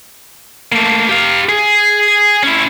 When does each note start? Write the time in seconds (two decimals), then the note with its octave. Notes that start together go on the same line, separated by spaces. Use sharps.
0.72 A3 A#3
1.09 G4 F5
1.49 G#4
2.43 C#4 E4